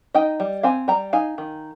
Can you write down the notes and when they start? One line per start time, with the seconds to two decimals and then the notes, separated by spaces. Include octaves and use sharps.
0.14 D#4 D#5 G5
0.40 G3
0.63 C4 F5 G#5
0.88 G3 G5 A#5
1.13 D#4 F5 G#5
1.38 D#3